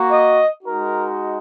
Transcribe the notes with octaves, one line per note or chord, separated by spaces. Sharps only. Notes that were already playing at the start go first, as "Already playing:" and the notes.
Already playing: A#3 F#4
D#5
G#3 D#4 F#4 A#4